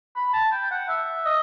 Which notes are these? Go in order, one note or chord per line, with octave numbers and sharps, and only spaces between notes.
B5
A5
G5
F#5
E5
D#5